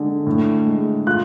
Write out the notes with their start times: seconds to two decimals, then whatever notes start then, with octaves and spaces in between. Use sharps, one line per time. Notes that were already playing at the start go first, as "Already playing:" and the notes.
Already playing: D3 G#3
0.27 A2
0.66 G#3
1.07 F4 F#6